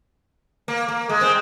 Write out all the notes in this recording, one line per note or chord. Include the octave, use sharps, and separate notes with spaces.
A#3
A#3
G#3
C4